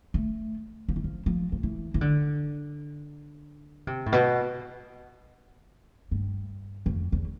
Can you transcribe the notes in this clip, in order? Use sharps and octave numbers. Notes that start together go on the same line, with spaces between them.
A3
F3
E3
F3
F3
F3
E3
E3
D3
C3
A2
B2
G2
F2
E2